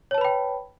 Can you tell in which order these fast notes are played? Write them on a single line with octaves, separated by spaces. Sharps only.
C#5 A5 B4 B5 G5